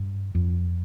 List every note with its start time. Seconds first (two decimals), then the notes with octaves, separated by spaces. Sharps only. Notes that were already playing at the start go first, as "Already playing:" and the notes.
Already playing: G2
0.35 F2